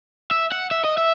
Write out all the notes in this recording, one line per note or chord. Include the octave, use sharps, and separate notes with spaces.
E5
F#5
E5
D#5
E5